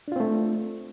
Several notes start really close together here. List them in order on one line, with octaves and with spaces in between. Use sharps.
D4 F4 C4 A3